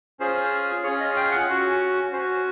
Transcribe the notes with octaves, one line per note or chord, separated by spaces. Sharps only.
C#4 F4 G#4 C5
C#4 F4 G#4 C#5
D#5
G5
F#5
C#4 F#4
C#4 F#4 C5